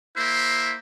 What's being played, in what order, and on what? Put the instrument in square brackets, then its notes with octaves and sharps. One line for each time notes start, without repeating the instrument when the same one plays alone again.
[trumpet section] A#3 E4 C5 E5